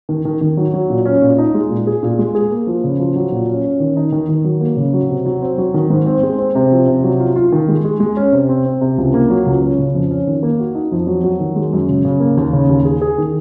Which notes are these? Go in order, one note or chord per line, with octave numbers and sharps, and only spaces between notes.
D#3
D#3
D#3
F#3
F#3
A#2
C#4
A#2
D#4
G#3
A#2
G#4
A#2
G#3
G#4
A#3
F3
C#3
F3
F#3
A#2
C#4
C#4
D#3
D#4
D#3
D#3
F#3
A#3
C#3
F#3
C3
F#3
C4
F#3
D#3
G#2
C4
G#3
C4
C3
F3
C3
F#3
F4
F4
D#3
G#3
G#3
G#3
C#4
C3
C4
C4
C3
C#2
A#3
F#3
C#2
C#4
C#3
F2
C#4
D#3
A#3
F#4
D#4
F2
F#3
F#3
D#3
G#3
F#2
C#3
C#3
A#3
D#2
C#3
D#2
G#4
G#4
D#3